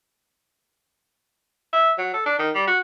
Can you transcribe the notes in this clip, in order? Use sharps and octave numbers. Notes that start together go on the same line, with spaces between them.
E5
F#3
A4
D4
D#3
G3
F#4